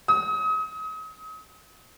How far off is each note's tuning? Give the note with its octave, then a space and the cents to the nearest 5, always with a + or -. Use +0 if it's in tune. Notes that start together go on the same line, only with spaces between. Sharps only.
D#6 +35